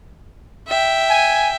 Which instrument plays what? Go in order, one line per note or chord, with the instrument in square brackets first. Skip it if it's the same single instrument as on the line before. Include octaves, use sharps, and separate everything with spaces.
[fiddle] E5 G5
[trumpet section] G#5